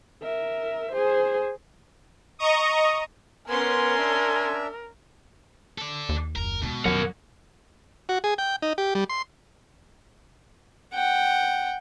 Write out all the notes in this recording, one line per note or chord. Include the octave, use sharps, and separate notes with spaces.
A#4 E5
G#4 C5
D#5 A#5 C#6 D#6
B3 C#4 A#4 G#5 C6
D4 E5
A4 D5
D#2
F#1 A#4
B2 D#3 G#3
F2 D#3 F#3 A#4 F#5
F#4
G#4
G5
D#4
G4
G3
C6
F#5 G5